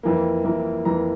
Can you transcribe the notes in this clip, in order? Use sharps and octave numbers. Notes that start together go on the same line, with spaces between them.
F2 E3 A#3
F2 E3 A#3
F2 E3 A#3 A#5